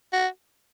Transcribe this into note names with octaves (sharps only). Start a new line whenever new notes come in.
F#4